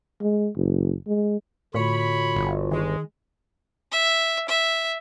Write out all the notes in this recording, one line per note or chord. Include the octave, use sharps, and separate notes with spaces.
G#3
F#1
G#3
A2 D3 F4 F#4 C#5 B5
G1
D#3 G#3
E5
E5